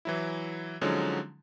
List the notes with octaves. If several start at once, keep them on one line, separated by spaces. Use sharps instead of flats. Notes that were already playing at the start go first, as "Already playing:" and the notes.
E3 F#3 E4
D3 F3 F#3 G#3 C#4 D#4